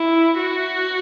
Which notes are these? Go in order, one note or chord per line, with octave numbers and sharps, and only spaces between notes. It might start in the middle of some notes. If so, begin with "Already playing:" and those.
Already playing: E4
F#4